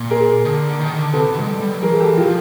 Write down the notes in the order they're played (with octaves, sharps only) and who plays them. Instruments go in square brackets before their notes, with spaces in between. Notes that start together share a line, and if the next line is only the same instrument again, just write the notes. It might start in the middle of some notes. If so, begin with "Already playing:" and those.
Already playing: [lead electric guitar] A#2
[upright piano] G#4 A#4
[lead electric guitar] D3
D#3
D3
[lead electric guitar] C3 [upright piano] A4 B4
[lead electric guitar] D3
G#3
G3
G3
F#3
[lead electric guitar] E3 [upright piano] G#4 A#4
[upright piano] G4 A4
[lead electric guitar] F3 [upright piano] F4 G4